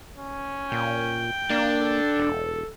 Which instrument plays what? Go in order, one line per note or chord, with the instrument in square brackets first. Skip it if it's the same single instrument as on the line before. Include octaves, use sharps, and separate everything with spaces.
[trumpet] C#4
[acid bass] A#2 [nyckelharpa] G5
[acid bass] A#3 [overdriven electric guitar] D4
[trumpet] A4
[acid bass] E1